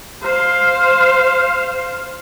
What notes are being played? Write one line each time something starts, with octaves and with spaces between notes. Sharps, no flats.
C5 F5